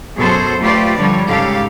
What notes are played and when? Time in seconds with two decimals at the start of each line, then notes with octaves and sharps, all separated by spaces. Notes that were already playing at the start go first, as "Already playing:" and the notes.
0.17 F#2 B2 G#4 A4 C5
0.60 A3 F4 G4 B4 C5 D5
0.98 D3 F3 G3 C#5
1.27 G#2 C#3 G4 A4 F5